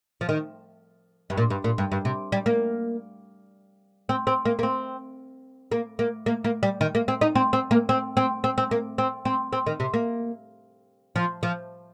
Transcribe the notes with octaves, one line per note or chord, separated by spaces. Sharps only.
F3
D#3
G2
A#2
G2
A#2
G2
G2
C3
G3
A#3
C4
C4
A#3
A#3
C4
A#3
A#3
A#3
A#3
G3
D#3
A#3
C4
D#4
C4
C4
A#3
C4
C4
C4
C4
A#3
C4
C4
C4
D#3
C3
A#3
F3
F3